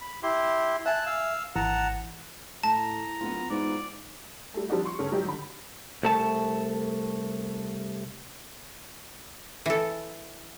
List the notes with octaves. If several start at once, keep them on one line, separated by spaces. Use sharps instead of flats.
B5
E4 G4 C6
E5 G#5 A5 F#6
F5 E6
G#1 E3 F#5 A5 A#5
A2 A5 A#5
D1 B3 F4
G#2 E3 B3 F4 D5
G3 A3
F3 G3 C4 D4 D#4 F#4
C6 C#6
G1 C#3 C#4 G#4 A4
G#2 F#3 G3 D#4 G4
D3 B5
C2 A3 A5
E3 A4